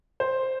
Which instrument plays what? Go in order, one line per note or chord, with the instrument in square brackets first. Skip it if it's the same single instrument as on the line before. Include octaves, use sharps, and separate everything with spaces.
[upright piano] C5